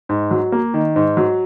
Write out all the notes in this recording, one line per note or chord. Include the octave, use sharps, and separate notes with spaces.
G#2
F#3
A#3
D#3
G#2
F#3